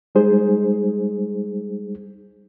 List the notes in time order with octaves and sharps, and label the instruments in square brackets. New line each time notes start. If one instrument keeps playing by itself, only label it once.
[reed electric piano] G3 G#3 D#4 G#4 C5